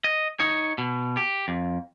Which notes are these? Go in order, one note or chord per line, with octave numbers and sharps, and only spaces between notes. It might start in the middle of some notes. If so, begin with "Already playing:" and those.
D#5
D#4 C#5
B2
G4
F2